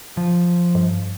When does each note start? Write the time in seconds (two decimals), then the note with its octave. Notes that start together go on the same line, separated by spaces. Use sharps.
0.17 F3
0.75 G2